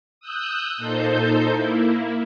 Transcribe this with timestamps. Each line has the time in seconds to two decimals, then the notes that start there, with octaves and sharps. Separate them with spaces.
0.20 D#6 E6 F#6 G6
0.77 A#2 D#4 A4 C5 G6
1.50 A#3 E4